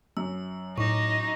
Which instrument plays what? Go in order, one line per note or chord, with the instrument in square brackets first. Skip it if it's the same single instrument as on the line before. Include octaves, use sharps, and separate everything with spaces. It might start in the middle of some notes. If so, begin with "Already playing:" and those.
[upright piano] F#2 [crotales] E6
[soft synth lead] A2 [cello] D#4 [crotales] C#6 D6